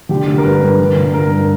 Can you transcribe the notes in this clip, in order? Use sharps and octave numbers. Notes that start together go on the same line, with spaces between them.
D3 G4
D3
A#4
G2 B4
G2
D3
D3
G2 A#4
G2